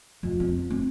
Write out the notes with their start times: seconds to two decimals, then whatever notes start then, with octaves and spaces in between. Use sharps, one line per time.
0.23 F2
0.40 C4
0.70 C4